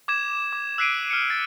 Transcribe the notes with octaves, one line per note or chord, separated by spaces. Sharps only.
D6 G#6 E7
D6
E6 F#6 B6 C7 D7 D#7
F6 C#7
A6 D7